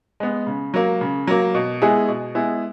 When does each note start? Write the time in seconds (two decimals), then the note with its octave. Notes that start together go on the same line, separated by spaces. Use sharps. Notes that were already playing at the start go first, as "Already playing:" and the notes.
0.20 G#3 B3
0.47 C#3
0.74 F#3 A#3
1.01 C#3
1.27 F#3 A#3
1.54 B2
1.82 G#3 B3 E4 G#4
2.08 B2
2.35 G#3 B3 E4 G#4